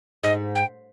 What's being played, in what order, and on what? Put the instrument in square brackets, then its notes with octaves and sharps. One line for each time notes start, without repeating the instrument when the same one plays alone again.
[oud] G#2 [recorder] D#5
[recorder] G5